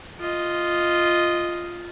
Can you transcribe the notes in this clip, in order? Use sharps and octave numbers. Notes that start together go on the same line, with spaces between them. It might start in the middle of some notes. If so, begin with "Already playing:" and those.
F4 D#5